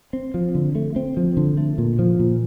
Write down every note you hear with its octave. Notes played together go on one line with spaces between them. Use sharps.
C4
F3
D3
A3
C4
F3
D3
A3
A#2
F3
A#2